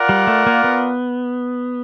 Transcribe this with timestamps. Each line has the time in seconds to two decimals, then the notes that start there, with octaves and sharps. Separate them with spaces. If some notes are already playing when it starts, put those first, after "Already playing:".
Already playing: F4 A#4 D5 F#5
0.09 G3
0.27 A3
0.47 A#3
0.64 B3